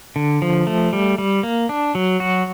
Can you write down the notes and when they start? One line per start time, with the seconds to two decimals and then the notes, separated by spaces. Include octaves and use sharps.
0.16 D3
0.42 F3
0.67 A3
0.93 G3
1.18 G3
1.43 A#3
1.69 D4
1.95 F#3
2.20 F#4